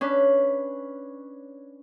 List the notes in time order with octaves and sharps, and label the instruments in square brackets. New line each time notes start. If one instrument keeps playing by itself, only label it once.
[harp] C#4 D4 B4